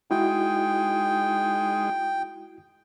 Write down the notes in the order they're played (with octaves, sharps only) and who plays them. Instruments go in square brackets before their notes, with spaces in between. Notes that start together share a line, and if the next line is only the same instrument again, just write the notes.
[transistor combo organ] G#3 D#4 [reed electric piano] E4 F#4 [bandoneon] G5